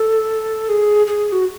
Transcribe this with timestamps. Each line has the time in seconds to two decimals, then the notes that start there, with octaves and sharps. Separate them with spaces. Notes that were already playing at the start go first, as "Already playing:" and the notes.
Already playing: A4
0.69 G#4
1.07 G#4
1.32 F#4